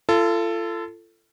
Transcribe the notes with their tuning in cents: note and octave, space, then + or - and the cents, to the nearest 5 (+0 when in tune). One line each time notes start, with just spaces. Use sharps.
F4 -35 A4 +10